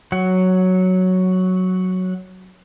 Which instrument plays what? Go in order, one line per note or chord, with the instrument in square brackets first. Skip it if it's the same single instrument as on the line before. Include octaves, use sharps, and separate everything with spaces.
[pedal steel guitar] F#3 F#5